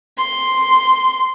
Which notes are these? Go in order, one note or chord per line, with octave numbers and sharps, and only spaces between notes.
C6